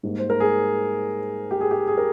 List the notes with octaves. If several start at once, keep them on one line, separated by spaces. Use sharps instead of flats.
G#2 G3 A#3
C5
A#4
G#4
G4
G#4
G4
G#4
A#4